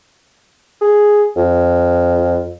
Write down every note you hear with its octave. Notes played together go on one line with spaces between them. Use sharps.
G#4
F2